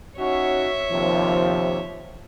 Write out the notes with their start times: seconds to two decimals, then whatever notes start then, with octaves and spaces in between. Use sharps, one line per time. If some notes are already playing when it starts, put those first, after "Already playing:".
0.18 C#4 D#4 F#4 C#5 E5
0.91 D#2 C3 F3